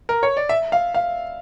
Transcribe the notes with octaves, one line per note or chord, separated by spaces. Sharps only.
A#4
C#5
D5
E5
F5
F5